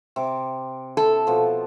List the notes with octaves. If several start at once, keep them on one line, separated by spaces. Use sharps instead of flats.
C3 D6
E4 A4 A5
B2 F3